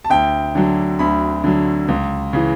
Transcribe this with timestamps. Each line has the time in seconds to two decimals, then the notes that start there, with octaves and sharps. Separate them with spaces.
0.04 A5
0.10 D2 G5
0.55 D3 F#3
0.99 D2 B5
1.44 D3 F#3
1.88 C#2
2.33 C#3 E3